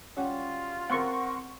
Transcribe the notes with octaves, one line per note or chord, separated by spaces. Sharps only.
G3 C#4 F4 F#4
C4 A#4 F#5 C6 C#6